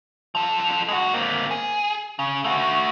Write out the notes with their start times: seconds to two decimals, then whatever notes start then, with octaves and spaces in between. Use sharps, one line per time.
0.35 F3 A4
0.89 G#3 F#4
1.14 A#3 C4
1.51 G#4
2.19 C#3
2.44 A3 F#4